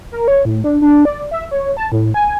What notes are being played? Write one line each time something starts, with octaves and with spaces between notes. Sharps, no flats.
A#4
C#5
A2
D4
D4
D5
E5
C#5
A5
A2
G#5